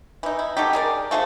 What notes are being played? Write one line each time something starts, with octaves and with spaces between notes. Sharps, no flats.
E3 D#4
E4
F#3 A3 D#4 G4
G#4 A#4 D5
A3 F4 G#4 C5